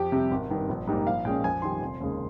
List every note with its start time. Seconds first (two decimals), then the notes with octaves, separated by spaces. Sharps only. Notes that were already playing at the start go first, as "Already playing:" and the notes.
Already playing: F2 G4
0.12 C3 G3
0.31 G#1
0.50 G2 D#3
0.69 A#1
0.87 G#2 G3 A#3 D#4
1.06 A#1 F5
1.25 A#2 G#3 C#4 G5
1.44 F2 G#5
1.62 D#3 G3 C6
1.82 F1
2.00 D#2 C#3 G#3